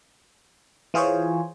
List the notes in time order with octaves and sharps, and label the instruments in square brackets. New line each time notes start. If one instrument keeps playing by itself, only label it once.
[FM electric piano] E3 F4 G#4 C5 C#5